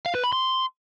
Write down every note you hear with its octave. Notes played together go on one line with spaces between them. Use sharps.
F5
B4
B5
C6